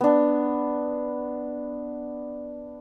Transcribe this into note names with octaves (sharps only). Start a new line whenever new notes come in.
B3 D4